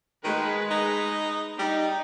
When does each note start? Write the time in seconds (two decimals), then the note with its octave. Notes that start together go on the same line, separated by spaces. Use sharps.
0.24 D#3 G#3 B4
0.71 D#4
1.59 G3 D#4